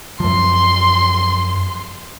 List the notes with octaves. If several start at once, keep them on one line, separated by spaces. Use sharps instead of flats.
F#2 F3 C6